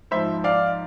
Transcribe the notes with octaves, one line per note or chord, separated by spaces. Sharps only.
G#2 F3 C5 E5
D5 F5